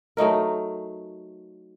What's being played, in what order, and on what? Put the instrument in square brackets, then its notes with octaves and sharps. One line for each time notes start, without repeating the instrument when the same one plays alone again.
[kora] F#3 A3 D#4 A#4